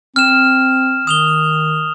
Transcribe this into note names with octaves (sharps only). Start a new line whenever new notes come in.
C4 F6 E7
D#3 D#6 F7 G7